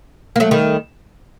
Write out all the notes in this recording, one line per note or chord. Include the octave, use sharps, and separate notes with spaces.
A#3
F#3 A3
D#3 G3